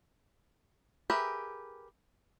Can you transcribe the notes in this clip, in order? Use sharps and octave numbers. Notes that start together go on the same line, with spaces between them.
G4 G#4 A#4 B4 E5